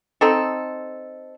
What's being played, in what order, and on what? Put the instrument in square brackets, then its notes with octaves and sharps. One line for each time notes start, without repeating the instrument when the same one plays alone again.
[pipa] C4 D#4 A4